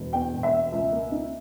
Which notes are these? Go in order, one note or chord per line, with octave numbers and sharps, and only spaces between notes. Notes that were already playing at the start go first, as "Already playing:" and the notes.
Already playing: E1
E2 G5
E1
E5
B2
C#2
A#3
D#4